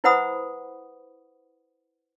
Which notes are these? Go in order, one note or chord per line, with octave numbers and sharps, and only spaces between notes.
E4 B4 C5 F#5 B5 D#6